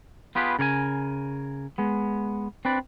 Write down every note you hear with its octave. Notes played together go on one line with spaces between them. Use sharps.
B3 F4 G4 G#4 B4
C#3 A#4 C#5 G#5
G#3 B3
C4 D4 B4 D5